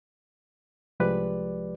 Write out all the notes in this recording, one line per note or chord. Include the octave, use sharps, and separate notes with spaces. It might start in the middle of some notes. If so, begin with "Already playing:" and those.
C2 F3 G#3 G4 B4 D5